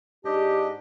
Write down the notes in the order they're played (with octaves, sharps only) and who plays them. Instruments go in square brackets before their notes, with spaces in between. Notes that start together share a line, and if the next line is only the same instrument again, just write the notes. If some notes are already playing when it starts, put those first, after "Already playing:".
[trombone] G#2 [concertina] D4 D#5 [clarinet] G4